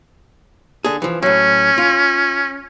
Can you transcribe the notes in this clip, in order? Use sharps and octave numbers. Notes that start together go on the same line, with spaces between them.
D3 G#4
E3 F3
A2 F#3 C#4
F4